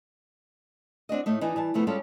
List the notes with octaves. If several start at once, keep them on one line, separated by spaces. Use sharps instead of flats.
C4 D4 F#4 D#5
A2 A3 D#4
E3 D4 D#4 D#5
E3 G3 A5
C3 F3 A3 B3
G3 G#3 C#4 F4 G4 A4